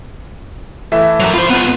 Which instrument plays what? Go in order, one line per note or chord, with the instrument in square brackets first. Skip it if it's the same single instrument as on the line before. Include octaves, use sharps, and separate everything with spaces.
[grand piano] E3 A3 E5
[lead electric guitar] F#3 A#4
[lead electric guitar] F4 C5 [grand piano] B5
[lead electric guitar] B3 F4